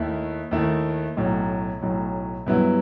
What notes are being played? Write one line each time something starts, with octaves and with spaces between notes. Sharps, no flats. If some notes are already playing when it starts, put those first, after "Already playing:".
Already playing: D#2 D#3 A3 E4
D#2 D#3 A3 E4
B1 A2 F#3
B1 A2 F#3
G2 F#3 B3 E4